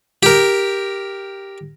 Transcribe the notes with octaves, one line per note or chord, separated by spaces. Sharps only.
G4 A#4